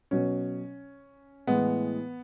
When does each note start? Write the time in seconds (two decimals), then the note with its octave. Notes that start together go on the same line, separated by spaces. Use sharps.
0.11 B2 F#3 C#4
1.47 A2 E3 G#3 B3